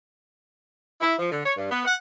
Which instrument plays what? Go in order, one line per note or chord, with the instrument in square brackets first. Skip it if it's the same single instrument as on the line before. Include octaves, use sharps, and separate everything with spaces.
[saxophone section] E4
F3
D3
C#5
G2
B3
F#5